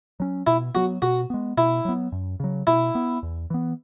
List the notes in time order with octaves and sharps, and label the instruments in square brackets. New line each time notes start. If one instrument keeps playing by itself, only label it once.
[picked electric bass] F#3 C#4
[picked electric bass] B2 [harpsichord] E4
[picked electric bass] F#3 B3 [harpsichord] F#4
[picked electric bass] B2 [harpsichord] F#4
[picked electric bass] G#3 B3
[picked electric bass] B2 [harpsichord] E4
[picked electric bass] F#3 B3
F#2
C#3 F#3
[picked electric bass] B2 [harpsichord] E4
[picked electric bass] B3
E2
E3 B3